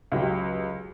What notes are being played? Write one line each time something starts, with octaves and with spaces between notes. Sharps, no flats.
C#2 F#3 G4